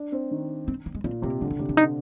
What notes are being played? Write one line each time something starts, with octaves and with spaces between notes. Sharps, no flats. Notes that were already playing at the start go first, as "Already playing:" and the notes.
Already playing: D4
C4
D#3
C4
A#3
G#3
A#2 C4
C3 A#3
D3 G#3
C4
C3 D4
D4
D3 D#4